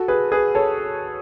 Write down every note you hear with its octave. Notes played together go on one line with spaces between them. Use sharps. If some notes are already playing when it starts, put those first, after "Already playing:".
Already playing: F#4 A4
G#4 B4
G#4 B4
A4 C#5